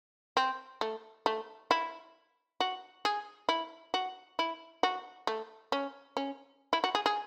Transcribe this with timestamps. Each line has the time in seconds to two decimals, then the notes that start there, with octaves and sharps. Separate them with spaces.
0.37 C4
0.81 A3
1.26 A3
1.71 E4
2.60 F#4
3.05 G#4
3.49 E4
3.94 F#4
4.39 E4
4.83 F#4
5.27 A3
5.72 C#4
6.17 C#4
6.73 E4
6.84 F#4
6.95 G#4
7.06 G#4